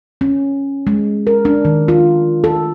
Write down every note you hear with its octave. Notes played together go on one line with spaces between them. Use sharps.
C#4
G#3
A#4
D4
D#3
F4
A4